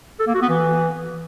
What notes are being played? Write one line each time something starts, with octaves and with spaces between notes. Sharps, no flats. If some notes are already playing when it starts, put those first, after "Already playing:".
A4
A#3
F#4
B3
E3